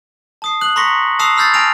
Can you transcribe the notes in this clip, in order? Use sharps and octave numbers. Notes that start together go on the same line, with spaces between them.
A5 D#6 C7
D#6 F#6 F#7
A#5 C6 C#6 A#6 B6 C#7
A5 D#6 E6 F#6 C7 F7
B5 E6 F6 G6 A6 C7
G#5 A5 F6 A#6 D7 F7